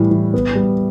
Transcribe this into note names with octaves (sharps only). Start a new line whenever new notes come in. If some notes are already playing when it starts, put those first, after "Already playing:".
Already playing: A2 E3 G3
E3
B3
G3